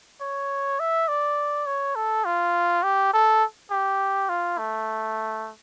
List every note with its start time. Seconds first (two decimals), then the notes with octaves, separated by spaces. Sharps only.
0.21 C#5
0.80 E5
1.08 D5
1.66 C#5
1.96 A4
2.25 F4
2.83 G4
3.13 A4
3.71 G4
4.29 F4
4.58 A3